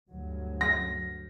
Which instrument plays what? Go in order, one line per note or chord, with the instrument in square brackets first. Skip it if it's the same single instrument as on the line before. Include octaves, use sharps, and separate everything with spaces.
[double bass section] D2 G2 F#3
[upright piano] A#6